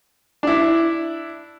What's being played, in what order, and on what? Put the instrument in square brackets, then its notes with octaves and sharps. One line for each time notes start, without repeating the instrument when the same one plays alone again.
[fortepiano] D4 E4